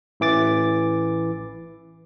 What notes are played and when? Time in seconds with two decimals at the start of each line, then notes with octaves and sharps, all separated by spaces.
0.20 A1 E3 D6 A6